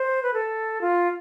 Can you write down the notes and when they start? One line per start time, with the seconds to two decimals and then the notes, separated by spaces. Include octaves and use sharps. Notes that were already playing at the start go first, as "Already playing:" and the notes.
Already playing: C5
0.23 B4
0.34 A4
0.81 F4